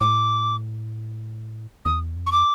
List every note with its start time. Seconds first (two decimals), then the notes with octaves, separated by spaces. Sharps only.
0.01 A2 D6
1.85 E2 D#6
2.16 F2
2.27 C#6
2.32 D6